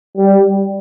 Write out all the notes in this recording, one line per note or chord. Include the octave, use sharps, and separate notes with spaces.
G3